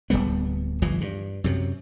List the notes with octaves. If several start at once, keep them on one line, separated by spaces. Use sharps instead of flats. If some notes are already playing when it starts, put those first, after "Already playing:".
D1 G#2 G3 B3
G1 E3 F3
G2
F#2 C3 F#3